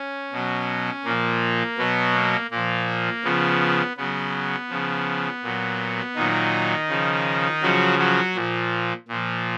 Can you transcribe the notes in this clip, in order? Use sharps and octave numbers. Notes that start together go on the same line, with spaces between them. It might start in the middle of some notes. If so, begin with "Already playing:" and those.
Already playing: C#4
B2 F#3
A#2 F3 A#3
B2 F#3 B3
A#3
A#2 F3 A#3
C#3 F3 B3
C#3 F#3 B3
C#3 F3
A#2 F#3
A#2 D#3 F#3 D#4
C#3 F3
C#3 F3 F#3 F#4
F#3 F#4
A#2 F3
A#2 F3